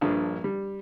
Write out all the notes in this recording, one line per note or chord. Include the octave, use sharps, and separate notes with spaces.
A#1 G2 F3
G3